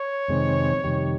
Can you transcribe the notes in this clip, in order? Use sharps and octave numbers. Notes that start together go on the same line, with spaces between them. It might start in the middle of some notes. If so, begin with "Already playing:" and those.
Already playing: C#5
F2 C3 D#3 G#3 C4
F2 C3 D#3 G3